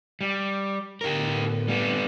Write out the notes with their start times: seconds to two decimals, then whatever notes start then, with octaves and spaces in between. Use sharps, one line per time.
0.21 G3
1.01 A2 D3 B3 G4 A#4
1.68 G3 B3 C4